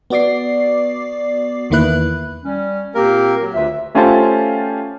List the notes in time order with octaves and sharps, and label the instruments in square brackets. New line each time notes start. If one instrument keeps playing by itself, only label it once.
[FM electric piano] B3 F#4 D5 D6 C7
E2 D#3 A#3 E4 B4 F#6
[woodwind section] G3 C#4
[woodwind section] A#2 C4 G4 [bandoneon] A#3 A#4
[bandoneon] F#3
[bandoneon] D2 [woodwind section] F4 B4 E5
[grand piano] A3 C#4 F4 G4 C5 A5